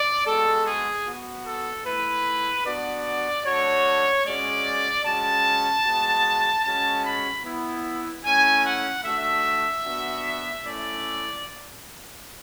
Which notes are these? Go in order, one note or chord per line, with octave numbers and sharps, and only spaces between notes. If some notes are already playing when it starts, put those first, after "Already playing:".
Already playing: D5
G#3 B3 F#4 A4
G#4
B3 F#4
A4
A3 E4 B4
B3 D4 F#4 D5
A3 D4 F#4 C#5
G#3 C#4 F#4 D5
G#3 C#4 F#4 A5
G#3 B3 F#4
G#3 C#4 F#4 A5
B5
B3 E4
A3 C#4 E4 G#5
F#5
A3 D4 F#4 E5
B3 D4 F#4
A3 C#4 E4 D5